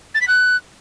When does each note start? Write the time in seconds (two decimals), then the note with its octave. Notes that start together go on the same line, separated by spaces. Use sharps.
0.14 A6
0.21 B6
0.28 F#6